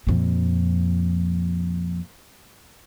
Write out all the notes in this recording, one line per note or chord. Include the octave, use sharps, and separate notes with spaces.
F2 A#2